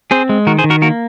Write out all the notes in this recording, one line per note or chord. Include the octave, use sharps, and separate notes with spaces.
C4 G#4 C5
G#3
D#3 F#4 A#4
G#4 C5
D#3
F#4 A#4
A#3 F#4 A#4